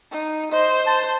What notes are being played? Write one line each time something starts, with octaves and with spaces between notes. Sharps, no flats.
D#4
C5 D#5
C5 A5